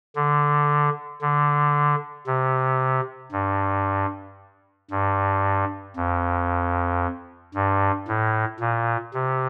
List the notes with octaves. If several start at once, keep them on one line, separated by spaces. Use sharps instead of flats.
D3
D3
C3
G2
G2
F2
G2
A2
A#2
C3